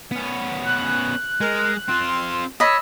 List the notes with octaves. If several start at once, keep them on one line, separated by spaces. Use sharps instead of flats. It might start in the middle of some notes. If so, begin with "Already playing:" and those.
B3 C#4
F#6
G#3 A#4
C4 F4 C6
C#5 D#5 B5 E6